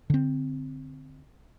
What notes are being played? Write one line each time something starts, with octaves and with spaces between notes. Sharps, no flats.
D3 C4